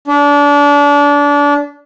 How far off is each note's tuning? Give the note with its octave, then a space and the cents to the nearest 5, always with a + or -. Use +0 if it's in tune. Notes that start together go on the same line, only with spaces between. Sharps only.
D4 -30